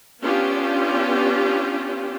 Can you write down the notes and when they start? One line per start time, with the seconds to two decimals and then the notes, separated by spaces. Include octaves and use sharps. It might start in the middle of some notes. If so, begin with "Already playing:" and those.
0.22 B3 C#4 D4 F4 G4